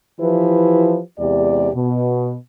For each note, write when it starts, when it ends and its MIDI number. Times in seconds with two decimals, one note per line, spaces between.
0.20 1.00 52
0.20 1.00 53
0.20 1.00 64
0.20 1.00 67
0.20 1.00 71
1.19 1.70 40
1.19 1.70 48
1.19 1.70 56
1.19 1.70 67
1.19 1.70 74
1.75 2.34 47